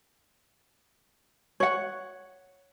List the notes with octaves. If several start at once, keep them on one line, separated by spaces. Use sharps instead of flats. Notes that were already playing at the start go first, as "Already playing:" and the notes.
C#5 F#5